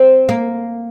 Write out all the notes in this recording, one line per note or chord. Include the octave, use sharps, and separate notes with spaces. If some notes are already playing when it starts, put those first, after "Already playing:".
Already playing: C4
A#3